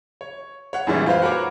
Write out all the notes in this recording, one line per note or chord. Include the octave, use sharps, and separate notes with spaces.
C#5
C#5 F#5
F#2 A#2 E3 G3 G#3
F4 B4 C5 F5
F#4 A#4 B4 C#5 D6